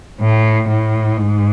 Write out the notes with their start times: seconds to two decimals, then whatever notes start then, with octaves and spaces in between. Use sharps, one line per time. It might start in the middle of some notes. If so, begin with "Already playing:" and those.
0.21 A2
0.68 A2
1.17 G#2